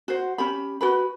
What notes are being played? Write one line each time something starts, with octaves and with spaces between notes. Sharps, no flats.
F#4 C5
C#4 G4 B5
F#4 B4 B5